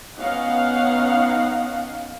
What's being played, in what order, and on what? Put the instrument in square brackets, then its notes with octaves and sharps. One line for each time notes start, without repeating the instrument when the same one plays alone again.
[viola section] B3 C#4 D#4 F5 F#5